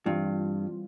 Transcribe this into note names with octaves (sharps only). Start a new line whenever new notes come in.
G2 E3 G3 C4 F4